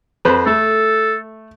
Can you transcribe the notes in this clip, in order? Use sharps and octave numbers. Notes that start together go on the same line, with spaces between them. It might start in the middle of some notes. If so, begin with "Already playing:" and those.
F2 B4 C5
A3 A4